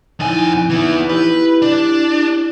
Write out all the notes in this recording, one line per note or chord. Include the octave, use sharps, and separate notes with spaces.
F2 D#4 E4 G#5
E3 B3
E4 G4 B4
D4